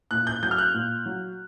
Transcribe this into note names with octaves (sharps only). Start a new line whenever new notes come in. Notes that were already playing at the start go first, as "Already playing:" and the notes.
A#2 F#6
G6
F#3 G6
F6
F#6
A#2
F#3